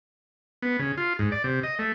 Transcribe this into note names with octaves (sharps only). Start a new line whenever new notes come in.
B3
C#3
F4
G#2
D5
C3
D#5
A3